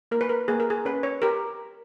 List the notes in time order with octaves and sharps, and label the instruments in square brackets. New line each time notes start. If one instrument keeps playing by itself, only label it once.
[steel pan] A#3 A#4
B4
A#4
A#3 G#4
A#4
G#4
C#4 B4
C#5
G4 A#4